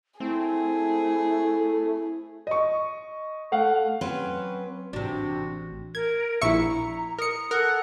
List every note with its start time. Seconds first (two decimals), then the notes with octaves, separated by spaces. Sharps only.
0.20 A3 C4 E4 G#4
2.47 D#5 C#6
3.52 A3 F5 F#5
4.01 F#3 C4 C#4 B4
4.93 A1 C3 D4 F#4
5.95 A#4 G#6
6.42 A#1 E4 E5 A#5 C#6 C#7
7.19 A#4 D#6 C#7
7.51 A4 A#4 F#5